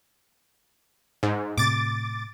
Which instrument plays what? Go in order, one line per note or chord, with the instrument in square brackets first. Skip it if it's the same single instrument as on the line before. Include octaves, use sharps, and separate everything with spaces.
[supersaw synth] G#2
[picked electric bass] A2 C3 [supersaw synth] D6 A6